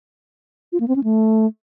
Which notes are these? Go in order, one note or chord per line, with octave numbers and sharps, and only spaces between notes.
F4
A#3
C4
C#4
A3